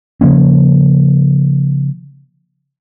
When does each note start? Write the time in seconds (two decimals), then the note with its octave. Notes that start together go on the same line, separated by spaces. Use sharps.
0.21 C#3 F3 A#3 C#4